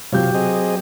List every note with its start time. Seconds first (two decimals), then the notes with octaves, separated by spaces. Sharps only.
0.13 C3 F#3 F4 G4 G6
0.34 C4 G#4 D#5